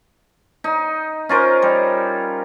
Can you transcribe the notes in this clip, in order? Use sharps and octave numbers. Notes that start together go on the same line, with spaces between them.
D#4
C#4 F4 A#4 C5
G3